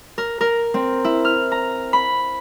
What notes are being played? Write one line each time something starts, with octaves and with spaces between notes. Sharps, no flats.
A#4
A#4
C4
E4
F6
A#5
B5